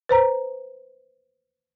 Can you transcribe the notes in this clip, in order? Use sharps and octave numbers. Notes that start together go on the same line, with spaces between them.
B4 C5 A#5